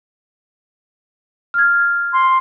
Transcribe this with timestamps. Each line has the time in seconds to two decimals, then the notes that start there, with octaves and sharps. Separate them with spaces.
1.54 F6 G#6
2.12 C6